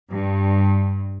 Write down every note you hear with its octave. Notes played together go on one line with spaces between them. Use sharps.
G2